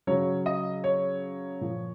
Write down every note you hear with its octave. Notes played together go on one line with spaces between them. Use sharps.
C#3 F#3 C#5
D#5
C#5
A#2 F3